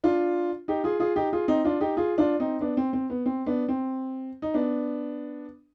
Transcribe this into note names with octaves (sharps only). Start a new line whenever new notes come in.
D4 F4
D#4 G4
F4 G#4
F4 G#4
D#4 G4
F4 G#4
C4 D#4
D4 F4
D#4 G4
F4 G#4
D4 F4
C4 D#4
B3 D4
C4
C4
B3
C4
B3 D4
C4
D#4
B3 D4